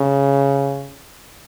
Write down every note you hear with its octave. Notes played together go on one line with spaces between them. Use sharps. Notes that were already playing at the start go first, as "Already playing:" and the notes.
Already playing: C#3